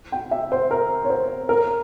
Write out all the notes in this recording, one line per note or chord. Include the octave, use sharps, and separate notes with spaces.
G5
E5
C5
A#4
C#5
C5
A#4